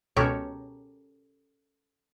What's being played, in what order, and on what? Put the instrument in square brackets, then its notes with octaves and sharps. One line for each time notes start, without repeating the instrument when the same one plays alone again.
[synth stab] C#2 B2 [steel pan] C#4 C#5 [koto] G4 A4 A#4